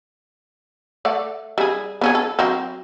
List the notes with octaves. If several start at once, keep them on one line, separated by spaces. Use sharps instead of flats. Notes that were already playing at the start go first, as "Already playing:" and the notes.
A3 D5 F#5
G3 G#4
B3 C#4 G#4
A4
F#3 C4